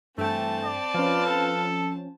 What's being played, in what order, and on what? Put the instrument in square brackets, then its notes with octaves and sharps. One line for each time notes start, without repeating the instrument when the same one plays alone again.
[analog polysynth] G2 G5 [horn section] E3 A3 [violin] C4 A5
[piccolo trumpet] D5
[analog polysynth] F3 C#4 [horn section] B4 F5
[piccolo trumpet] A4